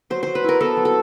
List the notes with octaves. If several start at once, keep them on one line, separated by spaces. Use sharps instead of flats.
F#3 C5
F#3 C5
B4
E4 A#4
B3 A4
F#3
A4